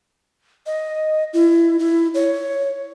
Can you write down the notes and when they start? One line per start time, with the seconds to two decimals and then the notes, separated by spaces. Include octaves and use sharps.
0.66 D#5
1.33 E4
1.79 E4
2.15 C#5